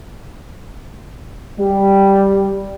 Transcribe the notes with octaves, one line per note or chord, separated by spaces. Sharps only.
G3